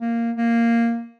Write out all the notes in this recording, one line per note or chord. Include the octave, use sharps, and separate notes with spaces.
A#3
A#3